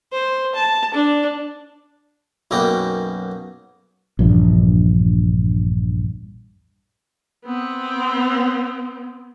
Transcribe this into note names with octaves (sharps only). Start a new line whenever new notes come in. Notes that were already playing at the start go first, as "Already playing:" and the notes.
C5
A5
D4
B1 F#2 A#3 B3 C#4 G5
A#1 E2 G2
B3 C4